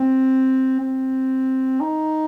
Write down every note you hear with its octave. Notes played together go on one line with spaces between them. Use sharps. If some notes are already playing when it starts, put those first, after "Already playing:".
Already playing: C4
C4
D#4